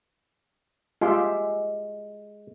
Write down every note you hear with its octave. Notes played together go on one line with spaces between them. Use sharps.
G#3 F4 G4 E5